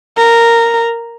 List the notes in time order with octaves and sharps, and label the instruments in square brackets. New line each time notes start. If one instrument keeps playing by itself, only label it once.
[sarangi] A#4